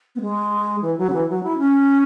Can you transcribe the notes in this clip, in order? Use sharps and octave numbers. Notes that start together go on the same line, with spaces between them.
B3
G#3
E3
F#3
C#3
E3
F#3
E4
C#4